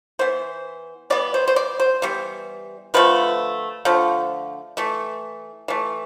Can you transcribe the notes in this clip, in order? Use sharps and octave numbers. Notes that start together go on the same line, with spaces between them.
E3 B3 C5
E3 G3 B3 D5
C5
C5
D5
C5
E3 G3 B3
D3 F3 A3 B4
D3 F3 A3
E3 A3
E3 A3